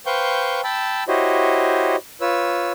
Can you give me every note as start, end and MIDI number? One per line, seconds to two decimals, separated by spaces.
0.06 0.61 71
0.06 0.61 72
0.06 0.61 77
0.06 0.61 79
0.06 0.61 85
0.06 0.61 91
0.64 1.04 79
0.64 1.04 81
0.64 1.04 83
0.64 1.04 88
1.08 1.96 64
1.08 1.96 66
1.08 1.96 67
1.08 1.96 72
1.08 1.96 73
1.08 1.96 75
2.21 2.72 65
2.21 2.72 71
2.21 2.72 73
2.21 2.72 88